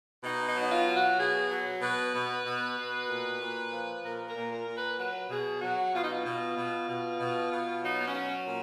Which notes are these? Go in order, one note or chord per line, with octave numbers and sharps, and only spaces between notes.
B2 D#4
D#4
F#3
D#4
F4
F#3
F#4
B2 G#4
F#3
B2 B4
B2
B2
B2
A#2
A#2
F3
A#2 A#4
A#4
A#2
A#4
A#2
B4
F#3 B4
B2 G#4
F#3 F#4
B2 F4
D#4
F4
B2
B2
B2
B2
B2
F#3 D#4
B3
C#4
F#3
A#2